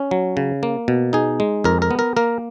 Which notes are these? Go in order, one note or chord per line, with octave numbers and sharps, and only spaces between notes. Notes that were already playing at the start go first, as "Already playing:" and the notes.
Already playing: C#4
F#3
C#3
A#3
B2
D#4 G#4
G#3
F2 A#4
A#4
B3
A#4
A#3 A#4